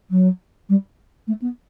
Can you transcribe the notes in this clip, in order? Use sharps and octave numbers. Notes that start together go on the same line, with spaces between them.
F#3
G3
A3
B3